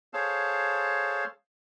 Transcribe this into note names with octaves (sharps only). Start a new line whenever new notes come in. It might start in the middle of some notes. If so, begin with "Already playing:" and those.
G#4 A4 C5 C#5 F5 A5